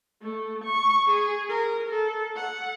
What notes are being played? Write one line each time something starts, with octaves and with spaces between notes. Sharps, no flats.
A3
C#6
G#4
A#4
A4
F#5